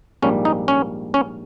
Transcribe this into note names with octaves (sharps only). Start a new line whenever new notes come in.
A#1 G#2 G3 A#3 C#4
D#4
C#4
C#4